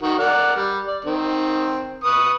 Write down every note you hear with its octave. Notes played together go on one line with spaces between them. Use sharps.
D#3 F#4
A#4 D5 F#5
G3
D5
D#3 C4
B4 C#6 D#6